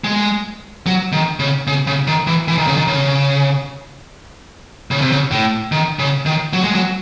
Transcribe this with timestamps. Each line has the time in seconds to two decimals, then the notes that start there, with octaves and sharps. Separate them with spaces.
0.04 G#3
0.86 F#3
1.12 D#3
1.39 C#3
1.67 C#3
1.87 C#3
2.07 D#3
2.27 E3
2.48 E3
2.58 D#3
2.67 C#3
2.77 D#3
2.88 C#3
4.91 C#3
5.02 C3
5.12 C#3
5.31 A2
5.72 D#3
5.99 C#3
6.26 D#3
6.53 F#3
6.64 G#3
6.75 F#3